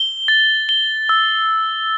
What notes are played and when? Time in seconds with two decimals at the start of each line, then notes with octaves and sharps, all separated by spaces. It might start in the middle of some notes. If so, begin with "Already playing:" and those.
Already playing: G7
0.28 A6
0.69 G7
1.09 E6